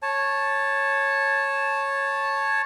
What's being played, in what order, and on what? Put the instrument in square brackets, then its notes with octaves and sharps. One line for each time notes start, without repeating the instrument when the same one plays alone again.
[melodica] C#5 A5